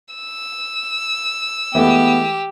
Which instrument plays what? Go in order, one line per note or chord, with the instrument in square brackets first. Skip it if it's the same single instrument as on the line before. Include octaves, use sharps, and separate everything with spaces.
[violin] E6
[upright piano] E3 G#3 A3 [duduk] B3 [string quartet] G4